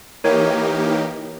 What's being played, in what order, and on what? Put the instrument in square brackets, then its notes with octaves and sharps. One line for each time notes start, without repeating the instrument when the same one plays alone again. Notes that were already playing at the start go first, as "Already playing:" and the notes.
[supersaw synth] E3 A#3 D#4 G4 [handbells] A#4 C#5